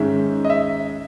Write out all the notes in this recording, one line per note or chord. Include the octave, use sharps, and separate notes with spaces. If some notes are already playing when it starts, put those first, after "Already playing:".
Already playing: G#2 D#3 G#3 C#4 E5
D#5
E5